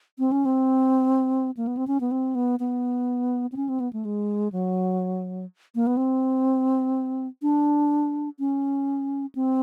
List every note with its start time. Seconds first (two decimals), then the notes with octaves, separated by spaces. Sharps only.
0.19 C4
0.32 C#4
0.45 C4
1.57 A#3
1.67 B3
1.77 C4
1.88 C#4
2.01 B3
2.11 C4
2.35 B3
2.60 B3
3.52 C4
3.56 C#4
3.69 C4
3.80 B3
3.93 A3
4.05 G#3
4.52 F#3
5.75 A#3
5.87 B3
5.97 C4
7.42 D4
8.39 C#4
9.35 C4